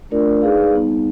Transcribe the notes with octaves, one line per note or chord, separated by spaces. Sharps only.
A3 D4 F4 A#4 D5
D#4 G#4 B4 D5 F5
G3 B3 D#4